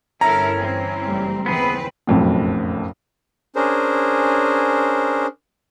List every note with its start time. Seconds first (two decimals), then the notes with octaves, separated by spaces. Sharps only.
0.21 G1 C#4 E4 A4 A#4 A#5
0.58 E3 C4
1.04 F#1 G3 A3
1.46 D#2 C#3 E3 B3 C4 G#4 B4
2.07 F#1 B1 F2 A2
3.56 C#4 D4 G#4 A#4 C5